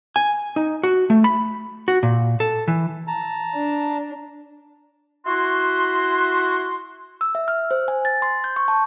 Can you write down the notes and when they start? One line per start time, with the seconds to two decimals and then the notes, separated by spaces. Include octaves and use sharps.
0.16 G#5
0.56 D#4
0.83 F#4
1.10 A3
1.24 B5
1.88 F#4
2.03 A#2
2.40 A4
2.68 E3
3.07 A5 A#5
3.53 D4
5.26 E4 F#4 C6
7.21 E6
7.35 E5
7.48 F6
7.71 C5
7.88 G#5
8.05 A6
8.22 C6
8.44 G6
8.56 C#6
8.68 A5